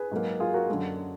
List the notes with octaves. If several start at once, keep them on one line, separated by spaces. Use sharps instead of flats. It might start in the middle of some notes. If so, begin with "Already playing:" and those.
Already playing: G#4 B4
G#2 F#3 A#3
F4 G#4
F#4 A#4
F#2 D3 F#3 A#3